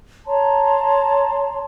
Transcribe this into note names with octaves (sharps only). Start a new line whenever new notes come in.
C#5 A5 A#5 C6